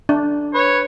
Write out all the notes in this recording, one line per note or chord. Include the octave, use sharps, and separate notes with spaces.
D4
B4 C#5